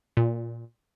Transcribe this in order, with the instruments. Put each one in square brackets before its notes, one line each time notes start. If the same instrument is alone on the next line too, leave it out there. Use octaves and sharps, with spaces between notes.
[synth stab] A#2